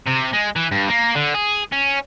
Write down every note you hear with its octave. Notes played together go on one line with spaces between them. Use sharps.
C3
G#3
E3
G2
A#3
D3
G#4
C#4